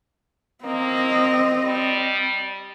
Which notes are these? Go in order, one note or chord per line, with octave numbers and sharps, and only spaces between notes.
A#3 C4 D#5
G3